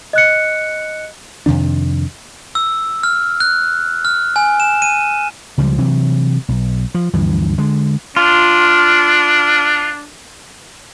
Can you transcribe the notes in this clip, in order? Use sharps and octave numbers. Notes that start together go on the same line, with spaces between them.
D#5 F#6 C#7
F2 C3 D#3 D4
E6
F6
F#6
F6
G#5
E7
D#7
C#2 C#3 F3 G3
C3 E3 F#3
B1
F3
D2 G2 E3 F3
D3 G#3
D4 F4